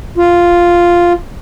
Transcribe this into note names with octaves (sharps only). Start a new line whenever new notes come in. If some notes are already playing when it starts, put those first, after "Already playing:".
F4